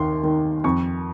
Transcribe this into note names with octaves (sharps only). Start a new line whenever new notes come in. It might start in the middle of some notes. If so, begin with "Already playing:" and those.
Already playing: D#2 D#3 C6
D#3
F2 C#6